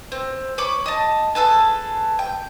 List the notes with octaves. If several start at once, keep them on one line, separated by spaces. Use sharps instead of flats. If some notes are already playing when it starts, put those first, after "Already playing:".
C4
C#5 B5 D6
D#5 A5
G#4 A4 B4 A5
G5